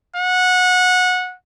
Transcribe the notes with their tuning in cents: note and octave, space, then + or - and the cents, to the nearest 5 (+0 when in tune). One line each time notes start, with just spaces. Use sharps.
F#5 -20